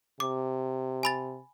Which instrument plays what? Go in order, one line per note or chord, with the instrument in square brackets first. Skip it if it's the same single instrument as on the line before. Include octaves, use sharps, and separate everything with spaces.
[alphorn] C3 [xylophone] D6
[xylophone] G#5 B5 A6